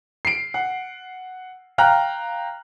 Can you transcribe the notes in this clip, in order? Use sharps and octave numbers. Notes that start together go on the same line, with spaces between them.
C7 D7
F#5
F5 G5 A#5 F6 F#6